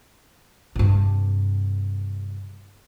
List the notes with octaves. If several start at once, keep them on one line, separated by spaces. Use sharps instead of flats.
G2 C3